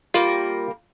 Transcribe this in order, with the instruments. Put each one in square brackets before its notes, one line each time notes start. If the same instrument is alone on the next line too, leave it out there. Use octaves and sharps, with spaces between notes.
[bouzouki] G3 A#3 A#4 [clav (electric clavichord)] F4